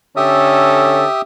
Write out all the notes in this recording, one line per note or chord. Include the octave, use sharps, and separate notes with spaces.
D3 C#4 G4 A4 E5 D#6